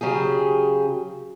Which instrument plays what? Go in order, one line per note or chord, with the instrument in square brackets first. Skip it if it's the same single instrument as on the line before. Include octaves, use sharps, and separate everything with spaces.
[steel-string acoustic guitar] C#3 F#3 G4 G#4